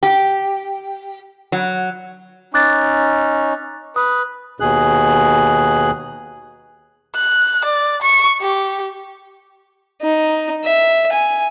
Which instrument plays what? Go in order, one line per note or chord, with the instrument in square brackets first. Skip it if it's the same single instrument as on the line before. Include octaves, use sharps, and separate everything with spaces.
[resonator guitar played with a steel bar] G4
F#3
[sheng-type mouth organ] C#4 D#4 [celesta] D6 F#6 A6
[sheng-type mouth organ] B4 [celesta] D#6
[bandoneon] D#2 B2 G#4 F#6
[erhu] F#6
D5
C#6
G4
[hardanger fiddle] D#4
E5
G#5